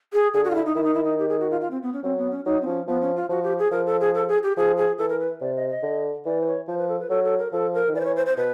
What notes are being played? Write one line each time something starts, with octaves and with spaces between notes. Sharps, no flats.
G#4
D3 G#4
F#4
F4
E4
D#4
D#3 E4
D#4
E4
D#4
G4
G#4
F#4
F4
F4
C4
B3
C#4
F#3 C4
B3
C#4
F#3 D#4
C4
F3 C#4
F3 B3
C#4
F4
F3 F#4
G4
G#4
F3 A#4
A4
G#4
A4
G#4
G4
F3 G#4
G#4
E3 A4
A#4
B4
C3 D5
D#5
D#5
D3
E3 D5
C5
C#5
F3 C5
B4
A4
B4
F#3 A4
A4
A#4
F3 A4
A#4
D#3
E3 D5
C5
C#5
C5
C5
B2 B4